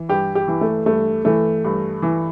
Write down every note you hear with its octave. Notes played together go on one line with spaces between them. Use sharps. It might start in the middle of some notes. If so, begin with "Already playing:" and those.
Already playing: E3
G2 G4
G4
E3
A3
G2 A3
E3 A3
G2
E3